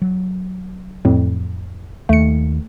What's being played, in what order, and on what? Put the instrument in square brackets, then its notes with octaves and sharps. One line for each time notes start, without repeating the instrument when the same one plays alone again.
[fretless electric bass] F#3
[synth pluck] F2 A2
[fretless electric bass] D#2 [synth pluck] A3 C#7